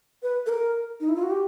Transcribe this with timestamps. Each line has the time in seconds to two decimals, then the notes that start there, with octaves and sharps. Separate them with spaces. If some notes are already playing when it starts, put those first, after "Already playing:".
0.23 B4
0.46 A4
0.49 A#4
1.00 D#4
1.09 E4
1.16 F4
1.23 F#4
1.30 G4